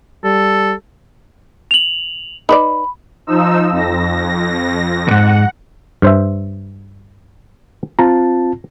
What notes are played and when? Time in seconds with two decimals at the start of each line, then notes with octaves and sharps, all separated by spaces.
0.24 G3 A4
1.71 F7 F#7
2.49 D#4 B4 D5 B5
3.27 F3 D#4 E6
3.71 F2 A#6
5.07 D#2 G#2 F#5
6.02 G2 C5 E5
7.99 C4 F4 A5 A#5